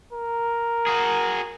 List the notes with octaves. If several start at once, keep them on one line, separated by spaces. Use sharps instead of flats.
A#4
F#4 G#4